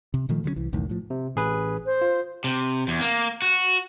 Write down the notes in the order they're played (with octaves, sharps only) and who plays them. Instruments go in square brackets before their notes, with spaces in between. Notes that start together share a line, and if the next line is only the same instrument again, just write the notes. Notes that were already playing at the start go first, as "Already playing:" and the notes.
[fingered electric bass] C3
A#2 D#3 F3 A3
D3 F#3 G3 C#4
C2 E3
B1 E2 A2 D#3
A2 F3
[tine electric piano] C3
A1 G#4 B4
[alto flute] C5
[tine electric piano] F4
[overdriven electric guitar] C3
E2
A#3
F#4